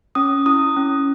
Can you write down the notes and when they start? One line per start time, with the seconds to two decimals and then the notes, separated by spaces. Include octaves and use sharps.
0.15 C#4 D#6
0.46 E4 D#6
0.76 C#4